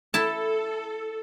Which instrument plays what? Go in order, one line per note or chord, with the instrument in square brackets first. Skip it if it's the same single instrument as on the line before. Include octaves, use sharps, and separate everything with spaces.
[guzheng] E4 A5 [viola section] A4